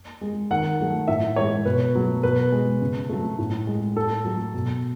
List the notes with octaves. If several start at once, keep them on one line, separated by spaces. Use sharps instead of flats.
G#3
D#3 F#5
F#3 A3
A2 E5
E3 G#3 C#5
B2 B4
F#3 A3
B2 B4
G#3
C#3
F#3 A3
A2
G#3
A2 A4
F#3 A3
B2